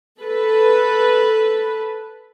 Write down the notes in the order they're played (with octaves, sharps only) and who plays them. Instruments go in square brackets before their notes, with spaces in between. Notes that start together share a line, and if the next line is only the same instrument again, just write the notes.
[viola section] A4 B4